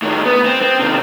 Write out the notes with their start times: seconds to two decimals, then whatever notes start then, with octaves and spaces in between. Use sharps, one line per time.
0.02 A2 D#3
0.25 B3
0.46 C4
0.62 C4
0.80 C3 D#3